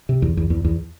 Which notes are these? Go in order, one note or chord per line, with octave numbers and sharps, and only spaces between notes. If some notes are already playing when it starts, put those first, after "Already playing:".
C3
E2
E2
E2
E2